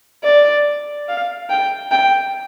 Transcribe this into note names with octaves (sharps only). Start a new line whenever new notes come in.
D5
F5
G5
G5